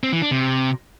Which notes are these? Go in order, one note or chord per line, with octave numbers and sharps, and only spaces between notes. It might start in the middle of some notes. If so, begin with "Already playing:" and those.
C4
E3
D4
C3